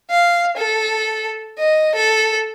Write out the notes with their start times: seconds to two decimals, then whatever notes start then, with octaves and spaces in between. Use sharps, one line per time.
0.10 F5
0.57 A4
1.59 D#5
1.95 A4